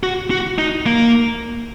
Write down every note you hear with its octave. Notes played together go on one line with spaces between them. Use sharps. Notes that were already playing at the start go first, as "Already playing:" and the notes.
F#4
F#4
D#4
A#3